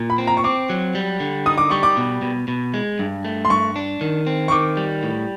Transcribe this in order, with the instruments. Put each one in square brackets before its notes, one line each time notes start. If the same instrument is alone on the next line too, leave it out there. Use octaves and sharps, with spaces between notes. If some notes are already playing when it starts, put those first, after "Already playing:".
Already playing: [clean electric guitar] A#2
[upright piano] B5
[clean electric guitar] C4
[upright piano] A#5
C#6
[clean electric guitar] C4 [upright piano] D6
[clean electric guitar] F#3
G3
D3
[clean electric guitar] D#4 [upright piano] D#6
[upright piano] D6
[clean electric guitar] G3 [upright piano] C#6
[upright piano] D6
[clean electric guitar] B2
B2
B2
G#3
G2
A3
[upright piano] C6
[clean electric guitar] G2 [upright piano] C#6
[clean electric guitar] D4
D#3
C4
[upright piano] C#6
[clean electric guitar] D#3 [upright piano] D6
[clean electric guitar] G3
A2